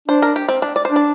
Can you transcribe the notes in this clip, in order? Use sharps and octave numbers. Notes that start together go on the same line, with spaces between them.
D4 C5
A#4
G4
C4
D4
D5
D4 C5
D5